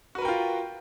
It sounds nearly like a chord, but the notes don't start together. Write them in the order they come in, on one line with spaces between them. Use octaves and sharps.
F#4 B4 A#4 G5 F4